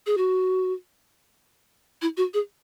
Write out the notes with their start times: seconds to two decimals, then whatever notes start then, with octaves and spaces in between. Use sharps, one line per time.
0.06 G#4
0.17 F#4
2.02 E4
2.17 F#4
2.34 G#4